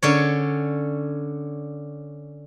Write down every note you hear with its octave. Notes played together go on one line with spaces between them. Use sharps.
D3 C#4 C#5